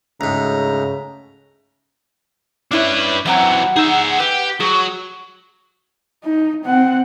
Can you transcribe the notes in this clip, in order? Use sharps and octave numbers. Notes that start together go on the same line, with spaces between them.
D2 G#2 C#3 A#5
C#4 D4 E4 B4 C#5
F#2 E3 F#3 C4 F#5 A#5
D#4 G#4 E5
G4 B4
F#3 G#4 C#6
D#4
C4 F#5